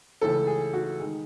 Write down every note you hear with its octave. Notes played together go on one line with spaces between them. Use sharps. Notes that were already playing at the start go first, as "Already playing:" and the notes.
C#2 C#3 E3 A3 A4
G#4
F#4
D#3 G#3